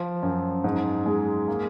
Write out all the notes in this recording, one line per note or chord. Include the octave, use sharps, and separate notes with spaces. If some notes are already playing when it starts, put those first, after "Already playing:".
Already playing: F3
F#2
G#2
G#3
A#3